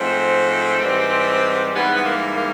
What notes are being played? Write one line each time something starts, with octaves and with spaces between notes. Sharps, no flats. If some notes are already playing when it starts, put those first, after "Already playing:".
Already playing: G#2 F3 A3 C4
G#2 E3 G3
G#2 E3 G3 B3
B3
A#3
A#3